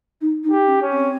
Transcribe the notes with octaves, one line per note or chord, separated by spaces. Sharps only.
D#4
D#4
G4
C#4
C#4
C4